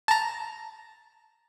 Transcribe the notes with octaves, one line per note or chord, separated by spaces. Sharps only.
A5 A#5